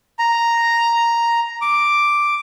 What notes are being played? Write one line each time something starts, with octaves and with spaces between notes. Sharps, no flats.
A#5
D6